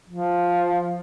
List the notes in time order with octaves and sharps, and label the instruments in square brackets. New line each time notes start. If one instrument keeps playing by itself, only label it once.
[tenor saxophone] F3